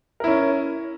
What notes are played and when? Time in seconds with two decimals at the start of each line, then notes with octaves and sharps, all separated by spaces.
0.20 A#4
0.24 E4
0.27 C#4